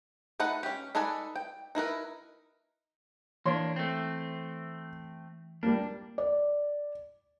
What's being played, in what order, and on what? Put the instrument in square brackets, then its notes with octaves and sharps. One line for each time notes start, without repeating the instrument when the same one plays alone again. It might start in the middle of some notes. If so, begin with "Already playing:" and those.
[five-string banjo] A3 D#4 B4 F#5
C#4 G4
D#4 A4 B4 D5 G#5
G5
D#4 E4 A#4 B4
[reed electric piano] E3 [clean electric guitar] A#3 D4 [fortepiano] C#5 C6
[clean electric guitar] A3 C4
[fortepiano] G3 A#3 [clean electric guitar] D4
[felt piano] D5